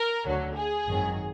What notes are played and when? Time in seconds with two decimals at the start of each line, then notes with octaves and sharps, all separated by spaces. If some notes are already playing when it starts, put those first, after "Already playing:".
Already playing: A#4
0.25 D2 D3 F#3
0.56 G#4
0.88 G#1 F#2 D#3 F#3